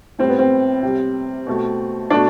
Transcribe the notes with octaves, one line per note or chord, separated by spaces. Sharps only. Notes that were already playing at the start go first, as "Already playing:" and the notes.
A2 G3 C4
B3
C4
C3 G3
B2 A3
B2 A3 D4